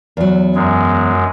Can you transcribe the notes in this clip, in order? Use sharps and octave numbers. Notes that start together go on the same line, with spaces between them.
E2 F#3
F#2 G#3